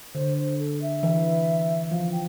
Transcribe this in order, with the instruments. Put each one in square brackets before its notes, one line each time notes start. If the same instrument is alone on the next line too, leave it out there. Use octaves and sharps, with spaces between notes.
[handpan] D3 [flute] C5
[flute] C5
A4
E5
[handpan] E3
[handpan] F3 [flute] F5
[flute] G5